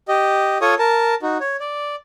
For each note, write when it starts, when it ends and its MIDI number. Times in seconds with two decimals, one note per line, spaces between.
0.08 0.58 67
0.08 0.58 75
0.61 0.75 65
0.61 0.75 69
0.61 0.75 73
0.61 0.75 85
0.61 0.75 87
0.79 1.15 70
0.79 1.15 81
1.22 1.38 63
1.22 1.38 66
1.40 1.57 73
1.60 1.96 74